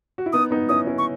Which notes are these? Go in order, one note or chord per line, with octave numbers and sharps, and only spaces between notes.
F#4
E4
B3 D#4 D#6
B3 D#4
C#4 E4 D#6
C#4 E4
C#6